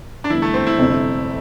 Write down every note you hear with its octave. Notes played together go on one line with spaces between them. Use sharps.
D4
G1 G2 E3 E4
A3
C4
E4
G1 F2 C3